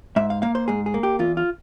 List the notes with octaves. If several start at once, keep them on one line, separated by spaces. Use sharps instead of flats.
G#2 E5
F5
A#3 F5
C5
G#2 G#4
G#4
A#3
G4
E2 F4
F4